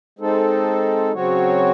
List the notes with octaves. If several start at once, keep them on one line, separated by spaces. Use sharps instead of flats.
G#3 C4 D#4 A4
C#3 F#3 C4 F#4 C#5